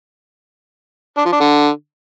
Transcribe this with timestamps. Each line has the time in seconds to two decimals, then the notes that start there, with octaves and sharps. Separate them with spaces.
1.18 D4
1.25 F3
1.33 D4
1.41 D3